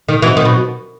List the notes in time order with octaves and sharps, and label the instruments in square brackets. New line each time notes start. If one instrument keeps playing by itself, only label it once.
[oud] D#3
[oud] E3 [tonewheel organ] F#3 C4 D#4 F#4 B4
[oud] D#3
B2